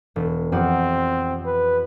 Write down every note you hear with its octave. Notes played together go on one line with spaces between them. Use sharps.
E1
F2 C4 G4 F#5
B4